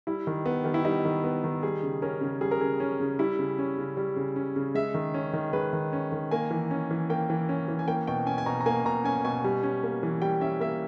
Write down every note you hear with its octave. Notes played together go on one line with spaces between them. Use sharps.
G3 E4
D#3
B3
D#3 G4
E4
G3 D#4
D#3
B3
D#3
G3 G#4
C#3
C#4 A#4
C#3
G3 G#4
A#4
C#3 G#4
C#4
C#3
G3 E4
C#3
C#4
C#3
G3
C#3
C#4
C#3
G#3 E5
D#3
C#4
D#3
G#3 B4
D#3
C#4
D#3
A#3 G#5
E3
C#4
E3
A#3 G5
E3
C#4
E3
G#5
A#3 G5
B2 G5
C#4 G#5
G#5
B2 A#5
A#5
A#3 G#5
B2 A#5
C#4 G#5
B2 G#5
G3
C#4
A#3
E3
G3 G5
C#4 E5
A#3 E5